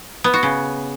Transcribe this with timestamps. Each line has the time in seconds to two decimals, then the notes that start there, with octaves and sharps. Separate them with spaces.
0.24 B3
0.34 F#4
0.43 C#3